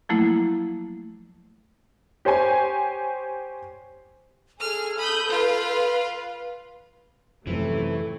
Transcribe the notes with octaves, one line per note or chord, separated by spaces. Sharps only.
F3 F#3 A3 A#3 E4
G4 C5 C#5 G#5
G#4 A4 F6
B5 D#6 G6
F4 B4 F5
F#2 A2 C3 E3 F3 A3